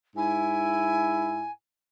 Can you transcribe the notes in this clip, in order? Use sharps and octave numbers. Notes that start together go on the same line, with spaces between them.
G#2 E4 G#5